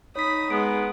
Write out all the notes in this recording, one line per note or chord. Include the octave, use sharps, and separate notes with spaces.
D#4 C#5 B5 D#6 B6
G#3 B3 D7